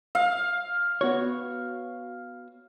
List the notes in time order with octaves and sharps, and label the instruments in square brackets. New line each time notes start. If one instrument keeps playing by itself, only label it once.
[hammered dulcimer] F5
[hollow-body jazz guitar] B3 F#4 C#5